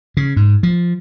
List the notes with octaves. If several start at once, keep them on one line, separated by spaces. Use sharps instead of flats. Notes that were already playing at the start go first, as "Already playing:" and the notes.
C#3
G#2
F3